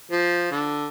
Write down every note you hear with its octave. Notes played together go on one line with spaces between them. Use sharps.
F3
D3